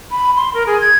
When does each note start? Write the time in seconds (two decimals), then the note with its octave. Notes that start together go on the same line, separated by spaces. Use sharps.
0.11 B5
0.37 C6
0.54 A#4
0.67 G#4
0.81 G#6